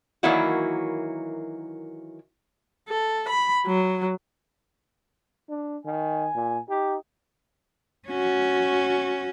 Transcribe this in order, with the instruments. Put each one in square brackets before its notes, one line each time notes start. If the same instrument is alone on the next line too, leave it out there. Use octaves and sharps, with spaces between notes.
[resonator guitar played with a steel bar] D#3 E3 F#3 A#3 E4 F#4
[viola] A4
B5
F#3
[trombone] D4
[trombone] D#3 [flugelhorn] G#5
[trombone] A#2
[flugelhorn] D#4 [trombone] G4
[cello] C#4 F#4